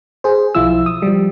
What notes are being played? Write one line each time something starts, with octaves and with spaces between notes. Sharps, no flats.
G#4 C5
B1 F3 E4 F4 E6
D#6
F3 G3